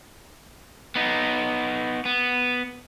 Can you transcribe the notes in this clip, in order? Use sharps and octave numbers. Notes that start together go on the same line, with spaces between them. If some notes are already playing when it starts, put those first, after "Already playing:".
B3 D#4
B3